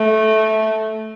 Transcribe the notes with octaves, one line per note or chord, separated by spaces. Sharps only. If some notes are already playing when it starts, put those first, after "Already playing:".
Already playing: A3